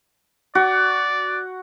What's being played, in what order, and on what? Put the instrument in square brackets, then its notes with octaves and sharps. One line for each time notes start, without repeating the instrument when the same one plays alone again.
[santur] F#4 [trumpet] D5